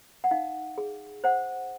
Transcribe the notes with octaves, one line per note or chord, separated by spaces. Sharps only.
F#5
D#4 F5
G#4
C5 F#5